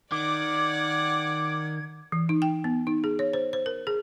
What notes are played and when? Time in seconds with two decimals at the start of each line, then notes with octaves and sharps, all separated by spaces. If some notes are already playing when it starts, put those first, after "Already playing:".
0.12 D#3 D5 F#5 D6 G#6
2.12 E3
2.29 D#4
2.42 G5
2.64 B3
2.87 D#4
3.04 G#4
3.19 C#5
3.33 C5
3.53 C5
3.66 A#4
3.87 G#4